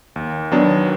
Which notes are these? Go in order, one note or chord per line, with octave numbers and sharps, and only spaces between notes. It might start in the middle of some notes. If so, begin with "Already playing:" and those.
D#2
D#3 F#3 B3 D4